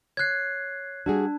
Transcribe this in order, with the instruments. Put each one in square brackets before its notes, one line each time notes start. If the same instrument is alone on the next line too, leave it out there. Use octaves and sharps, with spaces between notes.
[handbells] C#5 C7 [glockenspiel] F#6 G#6
[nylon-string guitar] G3 F#4 G#4 [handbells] D4